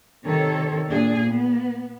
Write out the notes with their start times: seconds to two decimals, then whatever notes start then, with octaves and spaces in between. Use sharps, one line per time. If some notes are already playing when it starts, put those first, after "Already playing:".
0.25 C3 D#3 A4 C#5
0.88 A#2 D4 G#4
1.27 B3